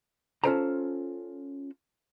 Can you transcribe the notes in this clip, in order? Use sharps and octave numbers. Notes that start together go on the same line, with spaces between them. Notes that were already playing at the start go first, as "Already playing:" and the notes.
C#4 F4 A4 C5 A5 A#5